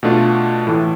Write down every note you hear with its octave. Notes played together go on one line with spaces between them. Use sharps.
B2 A3 D4 F4
A2 E3 A3